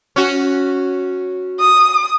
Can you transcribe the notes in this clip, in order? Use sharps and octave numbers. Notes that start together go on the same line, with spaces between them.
C#4 F#4
D#6